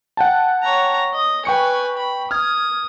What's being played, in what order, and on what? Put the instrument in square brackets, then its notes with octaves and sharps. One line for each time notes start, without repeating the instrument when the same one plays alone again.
[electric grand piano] F#5 G5 A5
[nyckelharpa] C#5 A#5
D#5 D#6
[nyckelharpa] B4 G#5 [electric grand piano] G5 C#6 C#7
[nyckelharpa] B5
[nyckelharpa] D#6 [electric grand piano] F6 G#6